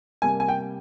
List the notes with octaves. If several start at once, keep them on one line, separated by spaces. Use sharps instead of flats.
C3 G3 A#3 G#5
G#5
G5